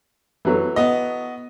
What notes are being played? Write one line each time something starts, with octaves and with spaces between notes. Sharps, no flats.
E3 F#3 A3
B3 D#5